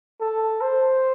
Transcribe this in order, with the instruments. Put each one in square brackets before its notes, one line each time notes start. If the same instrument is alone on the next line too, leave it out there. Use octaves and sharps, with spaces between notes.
[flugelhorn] A4
C5